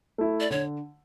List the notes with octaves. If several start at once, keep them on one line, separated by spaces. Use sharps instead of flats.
A3 E4
D5
D3 C#5